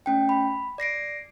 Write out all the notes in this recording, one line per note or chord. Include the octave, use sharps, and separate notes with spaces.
A3 C#4 G5
B5
D5 A#6 C7 D7